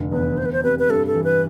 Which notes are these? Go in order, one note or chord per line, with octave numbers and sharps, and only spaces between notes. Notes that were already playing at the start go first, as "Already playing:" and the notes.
Already playing: F1 D3
E2 B4
E2 C5
B4
C5
C3 B4
B4
G2 A4
A4
E3
B4